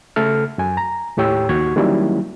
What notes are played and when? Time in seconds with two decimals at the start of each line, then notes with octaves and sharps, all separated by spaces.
0.16 C#3 A3 A4 F6
0.58 F#2 G#5
0.77 A#5
1.17 D#2 A2 G4 C#5 G5 E6
1.49 D#2 F#4 C#6 G#6
1.76 D#3 F#3 G3 A#3 C#4 E4